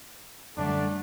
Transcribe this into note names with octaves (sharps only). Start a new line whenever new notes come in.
F#2 D3 G3 A3 D4